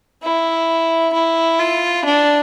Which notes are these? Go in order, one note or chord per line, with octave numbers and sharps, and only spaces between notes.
E4
E4
F4
D4